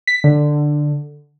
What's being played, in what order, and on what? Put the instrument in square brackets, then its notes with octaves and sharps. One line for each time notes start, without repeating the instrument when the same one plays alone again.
[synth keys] B6
D3